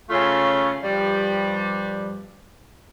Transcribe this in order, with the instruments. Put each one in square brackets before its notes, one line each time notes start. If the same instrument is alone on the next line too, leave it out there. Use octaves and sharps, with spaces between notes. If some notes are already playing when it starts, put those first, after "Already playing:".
[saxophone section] C#3 A3 C#4 F4
G2 F3 G3